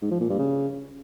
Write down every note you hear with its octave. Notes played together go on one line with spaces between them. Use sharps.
G#2
F3
A#2
G2
C#3